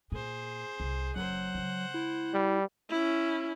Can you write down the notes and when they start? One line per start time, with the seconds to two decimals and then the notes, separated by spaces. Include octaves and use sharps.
0.12 A#2 G#4 C5
0.80 C2
1.16 F#1 F#3 C5 F#5
1.55 C#3 G#3
1.94 E4
2.34 G3
2.90 C#4 E4